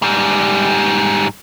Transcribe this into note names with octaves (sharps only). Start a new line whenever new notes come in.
G#2 G3